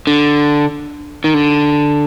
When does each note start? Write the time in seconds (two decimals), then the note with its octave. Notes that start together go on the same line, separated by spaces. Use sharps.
0.07 D3
1.24 D#3
1.34 D3